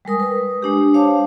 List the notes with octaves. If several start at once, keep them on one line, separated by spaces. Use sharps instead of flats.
G3 G#3 A#4 D#6
B4 D#6
G#3 D4 G4
C5 C#5 F5 A5 D6